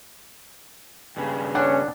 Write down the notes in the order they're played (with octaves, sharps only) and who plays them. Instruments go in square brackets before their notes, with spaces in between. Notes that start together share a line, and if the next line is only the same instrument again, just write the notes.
[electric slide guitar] G2 C#3
[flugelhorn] C#4 [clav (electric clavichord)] D4 [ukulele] F#5